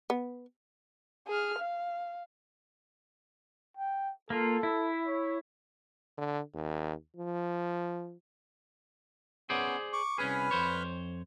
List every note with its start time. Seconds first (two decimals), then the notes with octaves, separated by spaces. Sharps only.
0.10 B3
1.28 G#4 F6
1.59 F5
3.77 G5
4.30 A#3 F4 A4
4.63 E4
5.07 C#5
6.17 D3
6.54 D#2
7.17 F3
9.50 B3 C#4 G#4 C5 D5
9.93 C#6 D6
10.18 C2 C#4 G#4 B4 B5 F6
10.51 F2 C5 C#5